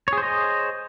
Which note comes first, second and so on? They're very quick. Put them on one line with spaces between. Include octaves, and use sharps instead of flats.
C#5 G#4 C5 D#5